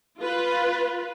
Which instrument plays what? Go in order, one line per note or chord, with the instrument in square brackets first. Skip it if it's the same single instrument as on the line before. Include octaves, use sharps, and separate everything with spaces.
[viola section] F4 B4